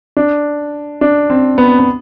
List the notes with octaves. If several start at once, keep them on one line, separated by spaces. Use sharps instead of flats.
D4
D4
C4
B3
B3